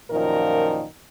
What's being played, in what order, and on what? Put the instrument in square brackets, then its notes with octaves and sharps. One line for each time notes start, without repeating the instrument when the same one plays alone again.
[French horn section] F#2 A#2 D#3 F3 A#4